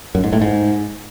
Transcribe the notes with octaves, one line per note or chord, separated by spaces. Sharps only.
F#2
G#2
A2
G#2